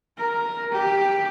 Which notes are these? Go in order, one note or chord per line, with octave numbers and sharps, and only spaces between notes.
A#4
G4